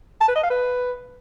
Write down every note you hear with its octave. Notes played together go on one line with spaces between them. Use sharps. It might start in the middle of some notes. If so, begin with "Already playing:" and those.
A5
B4
D#5
F5
B4